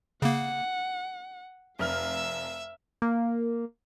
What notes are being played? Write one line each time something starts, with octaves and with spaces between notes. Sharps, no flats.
C#3 A#3 F#5
F1 E5 F5 E6 F6
A#3